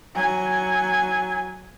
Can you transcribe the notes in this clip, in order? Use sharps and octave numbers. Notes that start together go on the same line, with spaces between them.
F#3 G#5